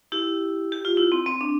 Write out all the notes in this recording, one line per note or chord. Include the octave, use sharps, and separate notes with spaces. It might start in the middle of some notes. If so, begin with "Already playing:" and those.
E4 G4
G4
F4
E4
C4
C4
D4